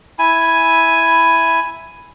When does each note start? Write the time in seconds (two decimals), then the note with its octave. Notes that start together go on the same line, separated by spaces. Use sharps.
0.19 E4 G#5